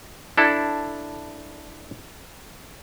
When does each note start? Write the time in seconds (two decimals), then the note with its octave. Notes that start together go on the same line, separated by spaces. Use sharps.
0.38 D4 E4 A4